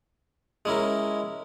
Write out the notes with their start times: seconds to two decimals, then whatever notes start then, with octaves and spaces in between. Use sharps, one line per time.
0.65 G#3 C#4 E4 A#4